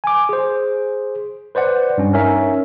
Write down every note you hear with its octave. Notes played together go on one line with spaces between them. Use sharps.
G#5 D6
G#4 C5
B4 C5 D5 F#5
G2 C#4
C#4 D#4 A#4 E5